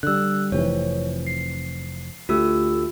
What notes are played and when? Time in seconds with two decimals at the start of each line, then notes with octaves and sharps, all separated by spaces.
0.03 D3 G3 E6 F#6
0.52 F1 C3 E3 C#5
1.27 C7
2.29 D2 A3 F4 G4 E6